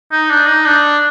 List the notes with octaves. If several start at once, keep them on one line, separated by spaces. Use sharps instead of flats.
D#4
D4
D#4
D4